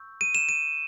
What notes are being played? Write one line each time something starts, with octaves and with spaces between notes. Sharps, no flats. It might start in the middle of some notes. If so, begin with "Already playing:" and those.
Already playing: C#6 E6 G6
D#7
E7
D#7